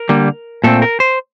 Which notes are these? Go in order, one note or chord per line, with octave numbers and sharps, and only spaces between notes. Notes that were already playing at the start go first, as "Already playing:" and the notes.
Already playing: A#4
D3 G3 A#3
A#2 A3 C4 A4
A#4
C5